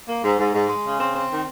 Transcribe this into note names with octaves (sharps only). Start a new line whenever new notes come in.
A#3
G#2
G#2
G#2
G#3
C#3
C4
C4
D#3